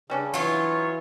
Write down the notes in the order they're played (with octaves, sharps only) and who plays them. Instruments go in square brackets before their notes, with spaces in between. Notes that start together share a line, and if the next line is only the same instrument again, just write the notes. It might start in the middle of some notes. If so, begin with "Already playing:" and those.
[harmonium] C#3 [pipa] G3 C#4 D4
[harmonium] E3 [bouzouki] F#3 F4 [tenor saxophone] C#5